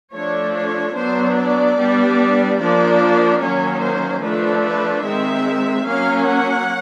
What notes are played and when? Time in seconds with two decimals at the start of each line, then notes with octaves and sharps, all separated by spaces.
0.13 F3 A3 D4 C#5
0.54 C#5
0.95 F#3 B3 D4 C5
1.36 D5
1.77 G3 B3 D4
2.59 F3 A#3 D4 D5
3.41 D#3 F#3 A#3 C#4 C#5
3.81 C5
4.22 F3 A3 D4 B4
4.64 B4
5.04 D#3 G#3 C4 E5
5.86 F#3 A#3 C#4 F5
6.26 F#5